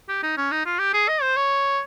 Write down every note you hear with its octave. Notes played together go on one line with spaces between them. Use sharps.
G4
D#4
C#4
D#4
F4
G4
G#4
D#5
C5
C#5